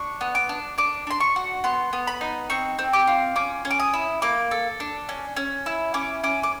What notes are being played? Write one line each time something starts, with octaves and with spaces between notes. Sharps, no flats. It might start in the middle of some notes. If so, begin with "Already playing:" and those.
Already playing: D4 C#6
B3
D6
D4
D4 D6
D4 C6
C#6
F#4
B3 C6
B3
B5
D#4
C4 C#6
C4
D6
F4
C#4 D6
C#4
D6
D#6
E4
A#3 D6
A4
D4
C#4
C#4
E4
C#4 D6
C#4 D6
D6